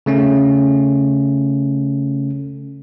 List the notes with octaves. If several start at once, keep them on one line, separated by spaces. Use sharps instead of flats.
C#3 A3 C#4